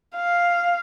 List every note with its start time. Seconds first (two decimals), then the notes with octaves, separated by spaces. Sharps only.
0.16 F5